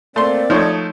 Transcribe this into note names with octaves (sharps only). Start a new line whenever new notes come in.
A3 A#3 C4 D5 C6
F3 A3 D#4 C#5